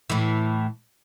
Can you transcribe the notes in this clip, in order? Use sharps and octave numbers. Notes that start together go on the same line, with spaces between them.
A2 E3